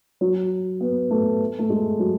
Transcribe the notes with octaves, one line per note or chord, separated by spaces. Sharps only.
F#3
B3
A3
A3
G#3
F#3